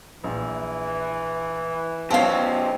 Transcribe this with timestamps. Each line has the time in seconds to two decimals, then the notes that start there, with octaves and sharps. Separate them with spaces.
0.24 A#1 E3
2.10 F#2 B2 C4 C#5 F5 A5 C6